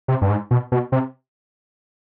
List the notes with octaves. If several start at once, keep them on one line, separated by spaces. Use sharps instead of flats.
C3
G2
G#2
B2
B2
C3